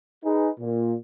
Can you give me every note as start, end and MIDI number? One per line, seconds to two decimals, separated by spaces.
0.24 0.49 63
0.24 0.49 68
0.24 0.49 71
0.60 0.94 46